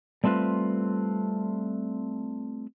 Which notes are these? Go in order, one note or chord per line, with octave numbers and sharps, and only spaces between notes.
G3 A3 C4 F4 B4